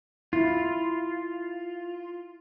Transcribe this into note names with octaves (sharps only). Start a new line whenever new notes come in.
E4 F4